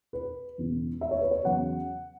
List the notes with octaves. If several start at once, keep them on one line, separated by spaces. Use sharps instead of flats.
B4
E1 E2 C#3 E3
E5
C#5
B4
C#5
E2 C#3 F#3 F#5